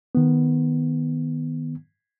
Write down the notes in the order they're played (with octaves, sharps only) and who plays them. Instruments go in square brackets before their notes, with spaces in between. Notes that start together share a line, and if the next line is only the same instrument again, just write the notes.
[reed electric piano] D#3 B3